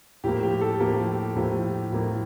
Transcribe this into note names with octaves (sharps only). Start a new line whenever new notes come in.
A2 F3 A#3 G4
G4
A4
A2 F3 A#3 G4
A2 F3 A#3 G4
A2 F3 A#3